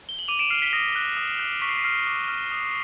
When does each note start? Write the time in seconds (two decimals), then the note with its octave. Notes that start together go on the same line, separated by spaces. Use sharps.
0.09 G7
0.19 F#7
0.28 D6 D#7 F7
0.39 D7 E7
0.50 F6 C7
0.62 B6
0.73 D#6 A#6
0.96 F#6
1.17 D#6
1.40 F#6
1.62 C#6 B6
1.69 C7
1.77 B6
1.84 F6 C7
2.07 D6
2.28 F6
2.51 D#6